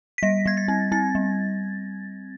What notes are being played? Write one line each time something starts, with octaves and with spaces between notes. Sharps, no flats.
B6
G3 A#6
G3 G#6
A6
C4
C4 A6
G3